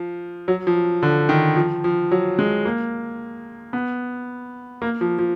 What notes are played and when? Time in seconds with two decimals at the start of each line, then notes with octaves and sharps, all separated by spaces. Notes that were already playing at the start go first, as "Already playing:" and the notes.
Already playing: F3
0.48 F#3
0.67 F3
1.02 D3
1.29 D#3
1.56 F3
1.84 F3
2.11 F#3
2.39 G#3
2.65 A#3
3.73 B3
4.82 A#3
5.01 F3
5.18 F3